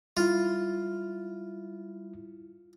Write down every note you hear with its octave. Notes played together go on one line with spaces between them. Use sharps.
G3 E4 F4